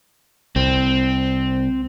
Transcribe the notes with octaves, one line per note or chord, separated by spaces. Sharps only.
C2 C4